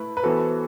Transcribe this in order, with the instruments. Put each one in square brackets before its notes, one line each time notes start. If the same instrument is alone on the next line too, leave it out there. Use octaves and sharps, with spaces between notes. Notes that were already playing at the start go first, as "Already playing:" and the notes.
Already playing: [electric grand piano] A3 E4 [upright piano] B4
[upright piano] B4
[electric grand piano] E3 B3 F#4 C5 [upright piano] A4